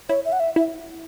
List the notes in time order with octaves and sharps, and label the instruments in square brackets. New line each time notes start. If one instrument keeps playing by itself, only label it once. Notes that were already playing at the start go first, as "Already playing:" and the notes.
[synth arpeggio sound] E4 [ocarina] C#5
[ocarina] E5
F#5
E5
[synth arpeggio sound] E4 [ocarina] E5